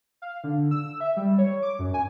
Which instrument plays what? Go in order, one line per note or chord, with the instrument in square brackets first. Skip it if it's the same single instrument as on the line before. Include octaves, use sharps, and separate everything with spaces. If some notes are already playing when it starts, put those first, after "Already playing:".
[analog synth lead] F5
D3
E6
E5
G3
C#5
D6
F#2
G#5